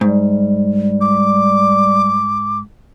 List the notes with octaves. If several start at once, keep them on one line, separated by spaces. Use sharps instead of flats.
G#2 G3
D6